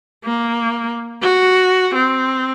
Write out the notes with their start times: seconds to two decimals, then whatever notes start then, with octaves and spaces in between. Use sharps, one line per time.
0.25 A#3
1.22 F#4
1.95 C4